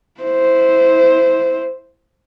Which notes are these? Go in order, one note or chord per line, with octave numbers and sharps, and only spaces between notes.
E4 C5